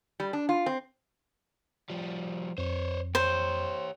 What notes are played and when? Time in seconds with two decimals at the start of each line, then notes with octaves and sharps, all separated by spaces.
0.20 G3
0.33 D4
0.49 F4
0.66 C4
1.90 F3 G3
2.58 F2 C5 C#5
3.15 G4 C5 C#5